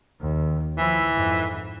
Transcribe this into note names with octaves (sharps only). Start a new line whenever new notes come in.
D#2
E3 F3 E4
F2 G#2